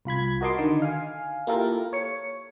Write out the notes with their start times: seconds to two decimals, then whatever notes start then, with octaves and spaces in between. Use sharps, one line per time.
0.05 C2 F4 B5 G#6
0.41 F#4 A#4 D#5 A5 C6 D6
0.58 D3 D#3 D#4
0.82 F5 G#5
1.47 A#3 E4 F4 G4 A4 A#4
1.93 C#5 C#7